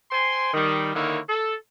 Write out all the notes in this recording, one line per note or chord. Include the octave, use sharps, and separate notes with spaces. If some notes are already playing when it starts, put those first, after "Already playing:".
C5 G5 G#5 C6
D#3 G3
D3 D#3 A#3 E4 C#5
A4